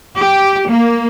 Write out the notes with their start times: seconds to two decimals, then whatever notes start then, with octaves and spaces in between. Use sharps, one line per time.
0.19 G4
0.68 A#3